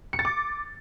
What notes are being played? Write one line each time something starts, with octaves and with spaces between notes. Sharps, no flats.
C#7
A6
D6